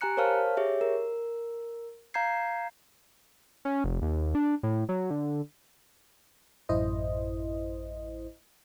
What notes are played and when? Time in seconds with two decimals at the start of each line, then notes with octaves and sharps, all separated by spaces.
0.01 G4 G#5 A#5 F#6 C#7
0.17 A#4 C5 C#5 F5 A5 F6
0.57 G4 G#4 C#5 E5
0.81 A#4
2.14 F5 A#5 G6 G#6 C7
3.65 C#4
3.84 F1
4.02 D#2
4.35 D4
4.63 A2
4.89 F#3
5.10 D3
6.69 A1 F#2 E4 C5 D#5